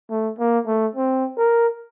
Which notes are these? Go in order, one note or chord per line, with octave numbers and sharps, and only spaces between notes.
A3
A#3
A3
C4
A#4